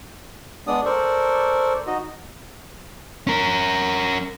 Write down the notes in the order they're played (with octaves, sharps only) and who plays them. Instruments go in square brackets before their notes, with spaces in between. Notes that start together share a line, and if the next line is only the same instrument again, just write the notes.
[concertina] G#3 B3 D4 D5 D#6
A4 A#4 C5 D5 C#6
D#4 F#4 D#5
[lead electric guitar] C#4 A#4